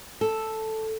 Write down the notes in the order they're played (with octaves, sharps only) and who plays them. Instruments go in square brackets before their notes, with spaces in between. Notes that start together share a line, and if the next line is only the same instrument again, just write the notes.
[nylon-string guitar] A4